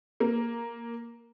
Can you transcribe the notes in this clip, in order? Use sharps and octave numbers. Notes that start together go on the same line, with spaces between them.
A#3